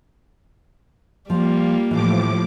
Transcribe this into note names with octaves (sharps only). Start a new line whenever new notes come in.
F3 G3 A#3 F4
A2 E3 F3 D6